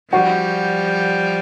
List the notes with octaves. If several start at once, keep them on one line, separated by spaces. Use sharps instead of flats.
F3 G3 F#4